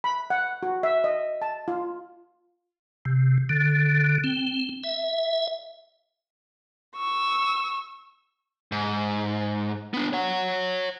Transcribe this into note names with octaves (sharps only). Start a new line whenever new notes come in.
B5
F#5
F#4
E5
D#5
A5
F4
C3
D3
C4
E5
C#6 E6
G#2
B3 D4
C#5 F#5